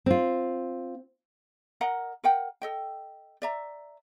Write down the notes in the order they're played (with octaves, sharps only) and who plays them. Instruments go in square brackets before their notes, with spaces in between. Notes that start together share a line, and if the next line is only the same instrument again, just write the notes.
[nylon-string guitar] C4 F4
[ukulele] A#4 D#5 F#5 A#5
A#4 F#5 G5
A4 D#5 G5
D5 E5 A#5